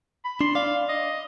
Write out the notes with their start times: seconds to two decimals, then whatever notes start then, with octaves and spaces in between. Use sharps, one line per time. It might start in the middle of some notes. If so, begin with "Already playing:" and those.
0.24 B5
0.41 D4 C6
0.55 D5 F5
0.89 D#5